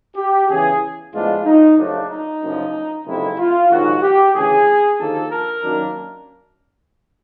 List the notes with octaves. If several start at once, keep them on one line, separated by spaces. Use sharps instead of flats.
G4
E2 C#3 E3 G#4
A2 F3 G#3 B3 D4 F4
D#4
F#1 F#2 C#3 F3 A3 D4
D#4
F#1 F#2 D3 F3
F#1 F2 C3 D#3 G#3 E4
F4
A#1 G#2 D#3 F#3 F#4
G4
D2 C#3 E3 G#4
D#2 D3 F3 A#3 A4
A#4
F#2 D#3 F#3 A#3 D4